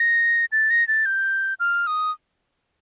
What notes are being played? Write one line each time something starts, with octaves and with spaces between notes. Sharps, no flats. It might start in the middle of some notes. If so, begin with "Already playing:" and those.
Already playing: A#6
A6
A#6
A6
G6
F6
D#6